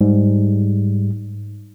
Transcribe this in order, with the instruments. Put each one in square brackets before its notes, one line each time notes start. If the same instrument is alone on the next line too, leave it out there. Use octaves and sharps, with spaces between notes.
[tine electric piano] G#2 G3